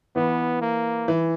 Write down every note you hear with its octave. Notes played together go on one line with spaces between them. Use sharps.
E3 B3
A#3
E3